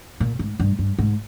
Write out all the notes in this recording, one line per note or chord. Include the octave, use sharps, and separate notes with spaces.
A#2
G#2
G2
G2
G#2